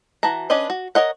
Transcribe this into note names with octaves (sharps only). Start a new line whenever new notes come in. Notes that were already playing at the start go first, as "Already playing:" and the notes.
E3 F#4 A5 A#5
C#4 D4 B4 D5 D#5
F#4
A#4 C#5 D#5 F#5